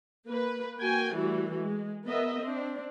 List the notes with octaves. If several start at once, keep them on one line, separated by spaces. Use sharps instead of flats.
A#3 B4
A#3 F#4 G5 G#5
E3 G3 A3 F#4
G#3
B3 A#4 D#5 E5
C4 D4